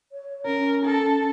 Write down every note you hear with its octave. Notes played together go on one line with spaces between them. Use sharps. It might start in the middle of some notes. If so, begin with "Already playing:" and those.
C#5
C#4 A#4
A4